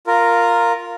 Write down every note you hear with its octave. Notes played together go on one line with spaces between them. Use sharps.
F4 A#4